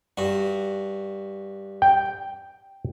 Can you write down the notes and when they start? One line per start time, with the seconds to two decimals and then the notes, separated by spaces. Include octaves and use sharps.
0.17 G2 F#4
1.82 G5